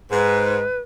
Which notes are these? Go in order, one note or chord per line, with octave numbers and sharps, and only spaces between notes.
G#2 B4